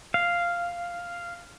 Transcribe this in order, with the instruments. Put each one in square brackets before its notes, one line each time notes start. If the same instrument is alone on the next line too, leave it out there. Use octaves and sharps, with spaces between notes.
[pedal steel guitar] F5